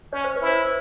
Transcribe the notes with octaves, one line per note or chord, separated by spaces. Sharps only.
C#4 C#5
C5
B4
E4
C5